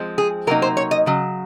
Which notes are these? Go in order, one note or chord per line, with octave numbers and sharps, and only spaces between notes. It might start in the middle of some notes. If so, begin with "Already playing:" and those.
Already playing: F3 G#3 C4
G#4
C3 F#3 A#3 D#4 A#4
C5
C#5
D#5
C#3 F#3